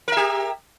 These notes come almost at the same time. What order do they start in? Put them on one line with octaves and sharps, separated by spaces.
A#4 E5 G4